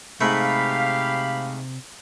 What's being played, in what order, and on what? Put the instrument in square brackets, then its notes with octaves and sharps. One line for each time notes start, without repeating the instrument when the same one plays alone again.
[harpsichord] G#2 A3 [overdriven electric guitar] C3 [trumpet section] G4 F5 [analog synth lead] B5